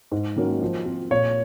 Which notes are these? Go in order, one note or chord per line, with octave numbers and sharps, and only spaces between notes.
G#2
D#3 F#3 A#3 C#4
F3
C4 F4
A#2 C#5